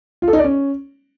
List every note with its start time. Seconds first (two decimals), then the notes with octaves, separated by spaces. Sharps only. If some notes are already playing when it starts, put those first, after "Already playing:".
0.22 F4
0.28 A4
0.33 D#4
0.39 D5
0.44 C#4